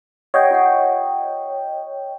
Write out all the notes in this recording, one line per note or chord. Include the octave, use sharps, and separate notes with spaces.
G4 C#5 D#5 F#5 G5
F4 F#5